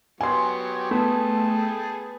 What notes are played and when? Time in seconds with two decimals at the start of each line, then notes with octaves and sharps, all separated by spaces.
0.21 F#3 B3 G4 G#5 C6
0.91 A3 B3 G#4 G5 A5